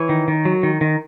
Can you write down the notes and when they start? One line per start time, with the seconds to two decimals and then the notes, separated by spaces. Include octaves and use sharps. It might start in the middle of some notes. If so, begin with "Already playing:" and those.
Already playing: E3 C#5
0.09 D#3
0.28 D#3
0.45 F#3
0.63 D#3
0.81 D#3